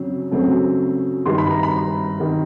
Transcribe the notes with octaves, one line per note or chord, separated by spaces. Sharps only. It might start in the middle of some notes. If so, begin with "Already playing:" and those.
Already playing: F#2 C#3 F#3 C4
F#2 C#3 F#3 A3 C4
G2 D#3 G3 C6
B5
A#5
B5
D#3 G3